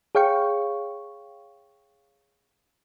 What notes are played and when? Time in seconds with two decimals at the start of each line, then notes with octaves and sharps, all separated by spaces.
0.15 G#4 C#5 F5 G5 C#6